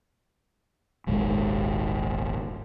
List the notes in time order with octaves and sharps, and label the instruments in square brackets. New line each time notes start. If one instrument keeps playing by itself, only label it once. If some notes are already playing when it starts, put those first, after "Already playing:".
[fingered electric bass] D#1 G#1 G#3